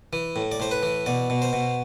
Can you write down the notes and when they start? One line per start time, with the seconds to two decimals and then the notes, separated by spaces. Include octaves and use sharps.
0.13 E3
0.36 A2
0.52 D5
0.60 A2 C5
0.71 B4
0.83 E3
1.06 B2 D5
1.30 B2
1.42 C5
1.53 B2